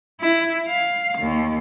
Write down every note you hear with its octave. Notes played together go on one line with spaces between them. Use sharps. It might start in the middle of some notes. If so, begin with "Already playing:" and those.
E4
F5
D#2